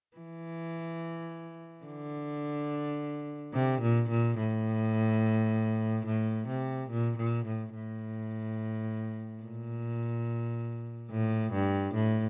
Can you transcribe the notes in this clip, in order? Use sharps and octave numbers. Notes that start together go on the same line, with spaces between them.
E3
D3
C3
A#2
A#2
A2
A2
C3
A#2
A#2
A2
A2
A#2
A2
G2
A2